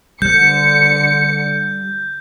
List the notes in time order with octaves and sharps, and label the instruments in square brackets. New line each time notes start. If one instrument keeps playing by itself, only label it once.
[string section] D3 C#7 [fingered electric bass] G3 [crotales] G6